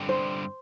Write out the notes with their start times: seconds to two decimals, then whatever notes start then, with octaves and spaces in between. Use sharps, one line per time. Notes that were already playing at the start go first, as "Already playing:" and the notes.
Already playing: G2 D3 G3 C4
0.09 C5